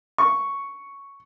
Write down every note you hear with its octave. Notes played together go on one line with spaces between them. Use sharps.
C#6